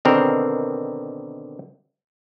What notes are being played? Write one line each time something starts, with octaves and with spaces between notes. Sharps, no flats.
B2 D3 D#3 C4 A#4